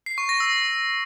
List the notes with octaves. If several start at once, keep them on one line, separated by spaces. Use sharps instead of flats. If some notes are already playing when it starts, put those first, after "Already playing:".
C7
C#6
A#6
E6